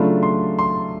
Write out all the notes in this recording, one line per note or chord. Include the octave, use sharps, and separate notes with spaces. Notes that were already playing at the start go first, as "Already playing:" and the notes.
Already playing: C#3 F#3 A3 D4 F4 B5
C6
C6